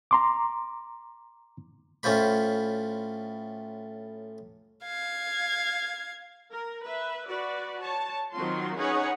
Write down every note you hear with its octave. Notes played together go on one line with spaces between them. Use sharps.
A#5 C6 D6
A2 C#4 F4 C5 B5
F5 G#6
A#4
B4 E5
F#4 B4 D5
C#5 A5
D#3 F#3 C4 F4 F#4 C6
C#4 D#4 G#4 B4 C#5 F#5